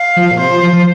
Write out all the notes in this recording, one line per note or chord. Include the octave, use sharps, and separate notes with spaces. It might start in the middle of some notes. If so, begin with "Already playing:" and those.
Already playing: F5
F3
A#2
C3 C5
F3
F3
F3